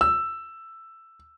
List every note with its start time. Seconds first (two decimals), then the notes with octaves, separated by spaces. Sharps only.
0.01 E6